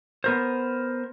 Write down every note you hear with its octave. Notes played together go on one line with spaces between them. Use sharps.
B3 A#4 C5